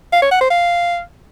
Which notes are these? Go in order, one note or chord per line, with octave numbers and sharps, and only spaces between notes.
F5
C#5
F#5
C5
F5